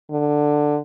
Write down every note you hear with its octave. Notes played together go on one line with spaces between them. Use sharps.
D3